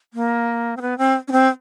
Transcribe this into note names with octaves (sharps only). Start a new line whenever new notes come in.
A#3
C4
B3
C4
C#4
C4